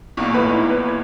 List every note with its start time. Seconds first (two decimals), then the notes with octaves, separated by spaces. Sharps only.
0.17 B1 E2 A#2
0.34 A2 B4 B5
0.50 D#4 E4
0.70 B4
0.89 G#6